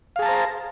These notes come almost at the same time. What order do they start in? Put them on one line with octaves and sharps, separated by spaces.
F5 G#4 A5 A#5 C5